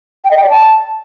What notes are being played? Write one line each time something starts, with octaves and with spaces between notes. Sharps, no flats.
G5
D#5
G5
D5
A5